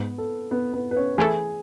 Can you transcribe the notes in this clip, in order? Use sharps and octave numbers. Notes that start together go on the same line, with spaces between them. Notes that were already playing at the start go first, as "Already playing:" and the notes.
Already playing: G#2 G#3 B3 B4
A4
B3 B4
B3 B4
B4
C#4 C#5
E3 A3 E4 G#4 A4 G#5